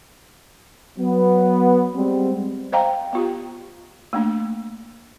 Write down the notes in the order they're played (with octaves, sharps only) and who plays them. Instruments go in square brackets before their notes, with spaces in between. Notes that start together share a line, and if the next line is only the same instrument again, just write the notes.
[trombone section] F#3 B3
G3 G#3 C4
[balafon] C5 D#5 F5 G5 A#5
B3 F4 G4
A3 A#3 D4